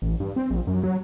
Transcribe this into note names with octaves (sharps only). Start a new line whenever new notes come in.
A1
G2
C4
A#1
F#2
F#3